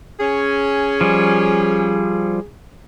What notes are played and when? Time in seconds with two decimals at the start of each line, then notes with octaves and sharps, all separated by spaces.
0.20 C#4 G#4
1.01 F3 G3